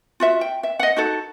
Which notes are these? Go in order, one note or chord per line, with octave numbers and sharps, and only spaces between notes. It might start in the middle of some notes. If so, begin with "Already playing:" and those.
F4 F#4 E5
G5
E5
D#5 F#5
D#4 F#4 A4